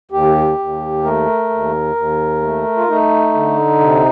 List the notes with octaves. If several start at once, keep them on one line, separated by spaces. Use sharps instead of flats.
D#2 G4
D#2
A3 A#4
D#2
D#2
A3
F4
A3 D#4
D3
C3